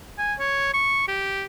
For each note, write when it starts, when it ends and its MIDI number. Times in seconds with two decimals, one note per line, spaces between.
0.18 0.34 80
0.39 0.69 73
0.74 1.04 85
1.08 1.45 67